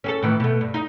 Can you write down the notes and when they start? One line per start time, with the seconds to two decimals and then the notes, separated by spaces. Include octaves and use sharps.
0.04 C#4 G#4 A4
0.23 A2 D#3 E3
0.40 B2 A3
0.61 G2
0.74 D#4